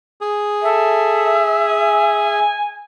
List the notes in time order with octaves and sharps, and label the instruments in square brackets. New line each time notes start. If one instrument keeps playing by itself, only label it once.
[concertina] G#4
[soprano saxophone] A4 [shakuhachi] E5
[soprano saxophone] G#5